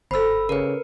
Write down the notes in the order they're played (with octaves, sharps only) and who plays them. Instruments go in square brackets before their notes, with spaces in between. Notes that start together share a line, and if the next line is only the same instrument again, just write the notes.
[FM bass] G1 [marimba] A4 C5 [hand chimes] B5 E6
[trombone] C#3 [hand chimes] A#4 B4